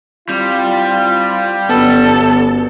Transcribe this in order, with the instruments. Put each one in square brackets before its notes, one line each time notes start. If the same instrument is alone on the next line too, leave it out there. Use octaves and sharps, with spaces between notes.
[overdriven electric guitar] G3 [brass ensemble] C4 E4 F4
[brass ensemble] G1 F#2 [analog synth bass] B3 [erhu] A4